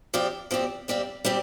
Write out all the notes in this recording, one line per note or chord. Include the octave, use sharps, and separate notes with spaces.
F3 C4 G4 D5
F3 C4 G4 D5
G3 C4 G4 D5 F5
G3 C4 G4 D5